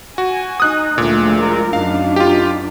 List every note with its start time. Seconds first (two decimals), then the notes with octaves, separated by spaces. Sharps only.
0.18 F#4 G#5
0.60 D#4 D#6 F#6
0.98 D2 A#2 F3 G#3 A3 F4
1.40 A#4
1.73 F#2 D4 D#4 F5
2.16 F4 G4